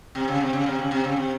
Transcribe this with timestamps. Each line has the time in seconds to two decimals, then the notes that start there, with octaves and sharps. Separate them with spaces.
0.15 C3
0.28 C#3
0.40 C3
0.53 C#3
0.66 C3
0.78 C#3
0.91 C3
1.04 C#3
1.16 C3